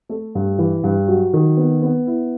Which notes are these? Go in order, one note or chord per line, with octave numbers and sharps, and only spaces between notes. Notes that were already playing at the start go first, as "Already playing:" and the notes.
A3
G2
E3
G2
F#3
D#3
B3
B3
E4